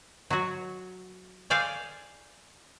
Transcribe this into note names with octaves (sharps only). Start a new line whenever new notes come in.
F#3 F#4
G#4 A4 C5 D5 F5 G#5